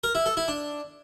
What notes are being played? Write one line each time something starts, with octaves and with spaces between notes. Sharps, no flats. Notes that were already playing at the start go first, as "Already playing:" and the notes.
A#4
E4
A4
E4
D4